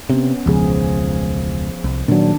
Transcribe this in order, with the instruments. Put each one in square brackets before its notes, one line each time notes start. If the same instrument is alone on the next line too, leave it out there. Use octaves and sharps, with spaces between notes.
[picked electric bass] C3 [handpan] B3 C#4
[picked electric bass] E1 C#2 [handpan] F3 G#4
[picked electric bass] C2
[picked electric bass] A#2 F#3 [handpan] D#3 D4